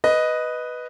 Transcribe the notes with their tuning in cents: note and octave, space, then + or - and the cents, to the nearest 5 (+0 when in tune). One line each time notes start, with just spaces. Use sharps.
B4 +0 D#5 +0